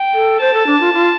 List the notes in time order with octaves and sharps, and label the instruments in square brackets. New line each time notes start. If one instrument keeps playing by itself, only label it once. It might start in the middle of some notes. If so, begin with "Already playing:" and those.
Already playing: [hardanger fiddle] G5
[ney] A4
[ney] C5 [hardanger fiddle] A5
[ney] A4
D4
F4
F4